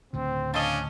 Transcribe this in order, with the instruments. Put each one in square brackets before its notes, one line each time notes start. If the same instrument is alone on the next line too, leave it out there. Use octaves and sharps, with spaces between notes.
[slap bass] D2 A2 C#3 [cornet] C4
[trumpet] C#4 [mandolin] D4 D#5 [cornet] F5